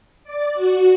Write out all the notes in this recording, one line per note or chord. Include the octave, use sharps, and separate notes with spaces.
D5
F#4